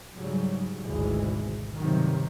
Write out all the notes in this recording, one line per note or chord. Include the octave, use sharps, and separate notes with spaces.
G#2 C#3 F#3 G3
G#1 D2 B2 E3 G#3
G2 C3 D#3 F#3